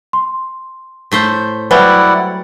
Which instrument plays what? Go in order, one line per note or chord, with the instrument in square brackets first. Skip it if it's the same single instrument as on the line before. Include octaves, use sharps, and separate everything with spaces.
[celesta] C6
[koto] A2 A3 C5
[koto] F#3 G3 [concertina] E4 D5 F#5 [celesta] B4 C5 G#5